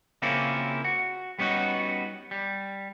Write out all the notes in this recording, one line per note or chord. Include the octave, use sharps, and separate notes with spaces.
C#3 A#3 C4 C#4 E4 F4
F#4
G3 B3 C#4 D#4 F#4
G3